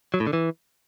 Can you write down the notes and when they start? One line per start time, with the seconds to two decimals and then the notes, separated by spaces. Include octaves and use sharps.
0.14 F#3
0.20 A2
0.27 D3
0.33 E3